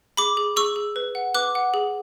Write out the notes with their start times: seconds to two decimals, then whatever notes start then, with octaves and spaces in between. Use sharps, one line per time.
0.17 G#4 B5 D6
0.37 G#4
0.56 G#4 C#6 E6
0.76 G#4
0.96 B4
1.15 F#5
1.35 B4 D6 F#6
1.55 F#5
1.74 G#4